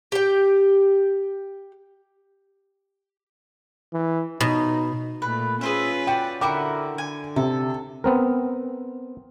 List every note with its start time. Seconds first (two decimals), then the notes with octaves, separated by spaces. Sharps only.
0.12 G4 G5
3.94 E3
4.41 B2 D#4
5.22 A#2 A3 B4
5.61 C#4 F4 G#4 B4 C5 E5
6.07 F#4 D5 G5
6.41 D3 E4 F#4 A#4 G5 D6
6.98 D3 G#5
7.36 C3 A4
8.04 B3 C4 A#4